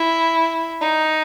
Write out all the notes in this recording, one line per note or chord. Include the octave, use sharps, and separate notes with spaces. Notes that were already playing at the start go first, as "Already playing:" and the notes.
Already playing: E4
D#4